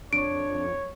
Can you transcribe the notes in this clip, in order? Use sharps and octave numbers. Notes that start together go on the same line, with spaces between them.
F2 D4 C#5 D7